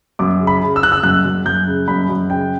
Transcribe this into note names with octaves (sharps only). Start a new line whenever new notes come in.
F#2 D6
C#3
B5
C#3
E6
C#3 F#6
E6
F#2 F#6
F#2
F#2 G6
C#3
F#2 B5
F#2
C#3 G5